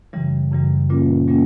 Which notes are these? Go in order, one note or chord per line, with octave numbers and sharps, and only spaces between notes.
F#2 C#3 E3 G3
F#2 C#3 E3 G3
A#2 G3 A#3 C#4 F4
A#2 G3 A#3 C#4 F4